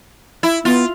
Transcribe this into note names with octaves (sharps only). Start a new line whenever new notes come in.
E4
B3 F4